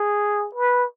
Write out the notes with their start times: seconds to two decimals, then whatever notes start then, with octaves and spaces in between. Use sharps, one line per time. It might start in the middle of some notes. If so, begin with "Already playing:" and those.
Already playing: G#4
0.55 B4